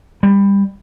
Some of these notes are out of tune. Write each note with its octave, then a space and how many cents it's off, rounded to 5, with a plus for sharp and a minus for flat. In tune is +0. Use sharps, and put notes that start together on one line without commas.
G3 +20